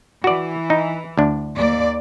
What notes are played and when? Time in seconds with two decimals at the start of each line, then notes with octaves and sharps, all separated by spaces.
0.24 E3 F#4 D5
0.70 D#4
1.17 D2 D4
1.55 D#2 D5